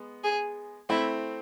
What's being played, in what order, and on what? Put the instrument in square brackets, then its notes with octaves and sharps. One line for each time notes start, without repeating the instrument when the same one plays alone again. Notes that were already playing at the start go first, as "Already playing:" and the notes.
Already playing: [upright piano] G#3 B3
[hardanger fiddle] G#4
[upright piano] A3 C4 [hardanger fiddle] E4